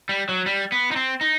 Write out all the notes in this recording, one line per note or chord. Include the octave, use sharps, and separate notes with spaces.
G3
F#3
G3
B3
D#4
C4
D#4